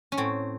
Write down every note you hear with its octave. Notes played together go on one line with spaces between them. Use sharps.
C#4
A2 C4